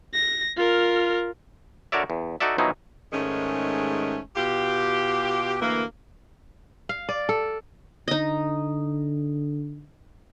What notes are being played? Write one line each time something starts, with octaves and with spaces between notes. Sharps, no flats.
A#6
F4 A#4
D3 F#4 A#4 C#5 D5 E5
E2
D#4 F#4 A4 D5 E5
B2 D#3 F3 F#3 D#4 E4
G#2 D#3 G#3 A3 C#4
B2 F4 G4
D2 E3 A#3
F5
D5
A4
D3 D#4 D#5